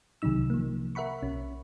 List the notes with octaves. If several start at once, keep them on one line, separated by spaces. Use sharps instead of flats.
C2 C3 D#3 F#3 D#4 E6
F3 A#3
A#4 E5 F#5 B5 C#6
B1 C#4